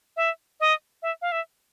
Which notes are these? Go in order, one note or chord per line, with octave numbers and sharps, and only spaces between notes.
E5
D#5
E5
F5
E5